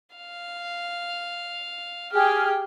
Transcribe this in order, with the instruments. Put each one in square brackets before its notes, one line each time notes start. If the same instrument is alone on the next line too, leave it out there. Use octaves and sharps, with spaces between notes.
[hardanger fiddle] F5
[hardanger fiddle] G4 G5 [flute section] G#4 F6